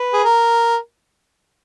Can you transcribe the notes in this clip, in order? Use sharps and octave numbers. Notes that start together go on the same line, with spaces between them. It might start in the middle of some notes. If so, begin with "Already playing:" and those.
Already playing: B4
G#4
A#4